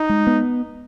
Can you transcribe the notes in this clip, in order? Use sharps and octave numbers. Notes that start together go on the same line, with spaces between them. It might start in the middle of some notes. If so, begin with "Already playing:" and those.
Already playing: D#4
G#3
B3